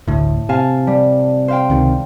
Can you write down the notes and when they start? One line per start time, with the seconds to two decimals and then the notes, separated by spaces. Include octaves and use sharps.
0.07 G1 D2 A2
0.49 C3 F5 G#5 A5
0.87 G3
1.48 C5 F5 G5
1.70 C#2 C3 D#3